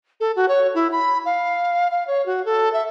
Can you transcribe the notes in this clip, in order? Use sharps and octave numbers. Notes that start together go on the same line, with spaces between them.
A4
F#4
C#5
E4
B5
F5
F5
C#5
F#4
A4
E5